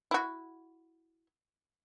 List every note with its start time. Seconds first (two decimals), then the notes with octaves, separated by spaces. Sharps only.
0.11 E4 F#4